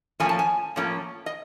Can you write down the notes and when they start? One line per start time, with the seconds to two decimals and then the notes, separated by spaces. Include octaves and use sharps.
0.20 A2 F3 A#3 C#4 G#5
0.29 A5
0.39 G#5
0.76 A2 F3 A#3 C#4
1.26 D#5